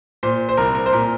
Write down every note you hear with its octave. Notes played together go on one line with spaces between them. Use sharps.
A#2 C5
C5
C2 A#4
A#4
C5
A#2 A#4